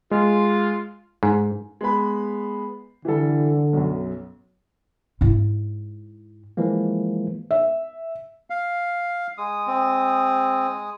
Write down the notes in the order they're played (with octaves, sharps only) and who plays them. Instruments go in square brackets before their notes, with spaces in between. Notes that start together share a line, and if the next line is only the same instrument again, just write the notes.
[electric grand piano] G#3 [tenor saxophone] F4
[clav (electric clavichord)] G#2
[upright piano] G#3 B3 B5
[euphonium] D3 [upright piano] E3 G3 A4
[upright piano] B1 F#2
[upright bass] G#2 E4
[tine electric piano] E3 F3 G#3 A#3
[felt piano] E5
[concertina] F5
[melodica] G#3 D#6
[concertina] C4